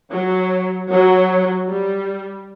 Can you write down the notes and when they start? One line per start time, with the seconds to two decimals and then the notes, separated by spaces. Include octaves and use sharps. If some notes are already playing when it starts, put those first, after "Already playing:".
0.12 F#3
0.91 F#3
1.69 G3